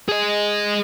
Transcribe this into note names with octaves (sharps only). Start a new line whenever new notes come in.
G#4 D#5